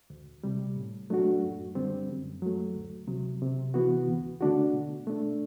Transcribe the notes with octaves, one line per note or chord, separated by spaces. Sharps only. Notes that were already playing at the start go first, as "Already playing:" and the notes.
D2
C3 G3
A2
F#3 A3 D4 F#4
F#2
D3 G3 C4
F#2
F#3 A3
D2
C3 F#3
C3
E3 B3 F#4
D2
D3 A3 D4 F#4
B2
A3 D4